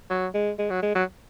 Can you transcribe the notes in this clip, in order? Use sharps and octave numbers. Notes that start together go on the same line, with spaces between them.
F#3
G#3
G#3
F#3
G#3
F#3